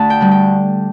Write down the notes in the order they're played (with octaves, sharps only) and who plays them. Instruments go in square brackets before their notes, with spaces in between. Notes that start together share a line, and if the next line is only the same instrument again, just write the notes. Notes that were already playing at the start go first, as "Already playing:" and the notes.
Already playing: [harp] D2 A5
G5
D3 G3
G5